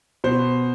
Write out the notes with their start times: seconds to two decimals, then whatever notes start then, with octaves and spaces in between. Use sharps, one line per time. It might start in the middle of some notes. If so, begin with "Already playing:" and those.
0.24 B2 C5